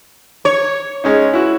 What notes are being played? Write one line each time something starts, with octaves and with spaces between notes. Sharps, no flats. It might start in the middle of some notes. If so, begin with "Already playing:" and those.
C#5
G#3 C#4 D#4
E4 F#4